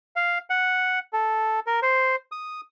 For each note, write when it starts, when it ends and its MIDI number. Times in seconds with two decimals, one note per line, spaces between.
0.16 0.38 77
0.50 0.99 78
1.13 1.60 69
1.67 1.80 70
1.82 2.16 72
2.32 2.61 87